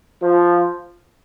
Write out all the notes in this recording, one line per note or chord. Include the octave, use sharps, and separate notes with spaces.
F3